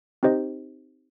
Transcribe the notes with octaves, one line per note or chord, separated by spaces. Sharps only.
C4 D#4 G4 C5 D#5